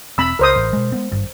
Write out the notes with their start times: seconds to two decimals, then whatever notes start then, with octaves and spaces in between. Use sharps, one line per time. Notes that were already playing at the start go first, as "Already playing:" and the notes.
0.18 E1 C4 B5 E6
0.39 C#2 A#4 C5 D#6
0.56 A1
0.73 B2 G#3
0.92 G#3 B3 C4
1.11 G#1 G2